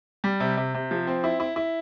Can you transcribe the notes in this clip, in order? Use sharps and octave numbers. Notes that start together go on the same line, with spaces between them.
G3
C3
C3
C3
F3
C4
E4
E4
E4